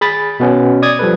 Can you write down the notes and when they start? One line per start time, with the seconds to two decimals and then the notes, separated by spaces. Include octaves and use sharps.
0.01 G#4 B5 A6
0.40 B2 B3 C#4
0.82 D5 D#6 G#6
0.99 F3 G3 A4 B4